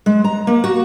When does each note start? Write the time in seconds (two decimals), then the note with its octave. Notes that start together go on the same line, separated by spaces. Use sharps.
0.06 G#3
0.24 A#5
0.47 A#3
0.64 F#4